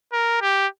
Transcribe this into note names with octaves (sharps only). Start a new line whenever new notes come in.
A#4
G4